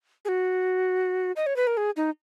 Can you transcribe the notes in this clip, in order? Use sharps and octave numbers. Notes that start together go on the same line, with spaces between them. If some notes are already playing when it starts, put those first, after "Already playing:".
G#4
F#4
D#5
C#5
B4
A#4
G#4
D#4